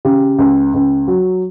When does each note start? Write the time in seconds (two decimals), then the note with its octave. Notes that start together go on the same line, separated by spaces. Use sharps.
0.05 C#3 G4
0.38 C#2
0.74 C#2
1.08 F#3